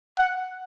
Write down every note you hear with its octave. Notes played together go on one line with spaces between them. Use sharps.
F#5